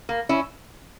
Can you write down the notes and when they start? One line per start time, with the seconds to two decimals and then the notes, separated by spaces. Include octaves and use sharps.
0.09 A#3
0.29 C#4 E4